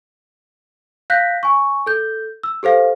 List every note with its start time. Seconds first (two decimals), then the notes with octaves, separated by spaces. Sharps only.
1.10 F5 F#6 G6 A#6 B6
1.43 G#5 C#6
1.86 A4 G6
2.43 E6
2.63 G4 A4 C5 F5